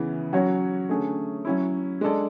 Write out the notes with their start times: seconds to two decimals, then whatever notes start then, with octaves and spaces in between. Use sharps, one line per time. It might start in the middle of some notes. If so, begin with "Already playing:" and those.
Already playing: C#3 E3 B3
0.33 F#3 C#4 F#4 C#5
0.89 D3 A3 C#4 G#4
1.45 F#3 C#4 E4
2.01 G#3 D4 A4 D5